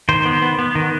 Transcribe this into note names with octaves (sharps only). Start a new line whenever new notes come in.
D#3 C5
B3
B3
B3
D#3